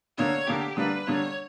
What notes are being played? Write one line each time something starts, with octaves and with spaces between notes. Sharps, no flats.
D3 A#3 D4 C#5
D3 A#3 D4 G4
D3 G3 A#3 D4 B4
D3 G3 A#3 D4 C#5